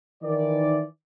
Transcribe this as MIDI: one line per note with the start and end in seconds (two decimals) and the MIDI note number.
0.23 0.83 51
0.23 0.83 52
0.23 0.83 74